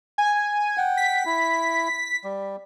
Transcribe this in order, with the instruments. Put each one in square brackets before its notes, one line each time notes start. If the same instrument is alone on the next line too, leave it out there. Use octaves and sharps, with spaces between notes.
[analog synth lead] G#5
[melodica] F#5 G5
[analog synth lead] B6
[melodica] E4
G3